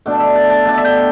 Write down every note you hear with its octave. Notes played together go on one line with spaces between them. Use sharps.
B2 A3 D4
E5
A5
A5
B2 A3 D4 A5
E5
G5